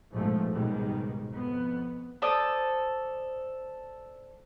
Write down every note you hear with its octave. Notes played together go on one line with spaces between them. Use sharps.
A#1 G#2 B2 F3 G#3 A3
C#2 G#2 B2 D#3 G3 G#3
F2 B3
A4 C5 D5 D#6